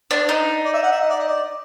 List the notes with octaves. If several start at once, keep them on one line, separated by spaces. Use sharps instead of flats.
D4
D#4
D5
E5
F#5
E5
D#5
D5
D#5
D5